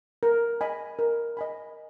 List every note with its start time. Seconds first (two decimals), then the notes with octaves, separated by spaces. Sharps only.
0.23 A#4
0.61 D#5 G#5 B5
0.99 A#4
1.37 D#5 G#5 B5